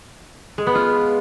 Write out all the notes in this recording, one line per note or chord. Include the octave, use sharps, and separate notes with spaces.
G#3
B3
F4